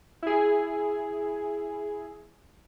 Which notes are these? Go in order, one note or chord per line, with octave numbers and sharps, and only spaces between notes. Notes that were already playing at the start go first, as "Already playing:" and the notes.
E4 G#4